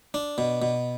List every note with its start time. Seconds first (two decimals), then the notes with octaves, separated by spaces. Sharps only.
0.14 D4
0.38 B2
0.62 B2